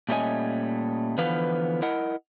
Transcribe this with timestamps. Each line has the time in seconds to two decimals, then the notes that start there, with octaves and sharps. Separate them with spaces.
0.09 A#2 G3 A3 C#4 D#5 G#5
1.18 D3 E3 F3 B3 B4 F5
1.82 E4 A#4 D#5 F#5